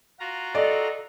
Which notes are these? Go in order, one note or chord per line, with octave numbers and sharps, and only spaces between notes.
F4 F#4 A#5
A4 D5 D#5